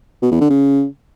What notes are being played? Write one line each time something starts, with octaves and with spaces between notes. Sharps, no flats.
B2
E2
D3
C#3